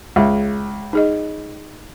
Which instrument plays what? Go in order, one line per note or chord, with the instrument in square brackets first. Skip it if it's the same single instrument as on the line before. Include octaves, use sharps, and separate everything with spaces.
[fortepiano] C#2 [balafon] G#4 E5
[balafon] D#4 G#4 D#5